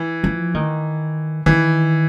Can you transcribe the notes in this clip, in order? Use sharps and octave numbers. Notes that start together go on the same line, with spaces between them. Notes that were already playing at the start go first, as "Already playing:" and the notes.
Already playing: E3
F3
D#3
D#3 E3